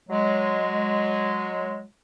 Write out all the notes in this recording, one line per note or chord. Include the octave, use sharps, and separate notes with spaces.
F#3 G#3